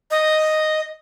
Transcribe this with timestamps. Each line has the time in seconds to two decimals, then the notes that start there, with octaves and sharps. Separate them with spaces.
0.11 D#5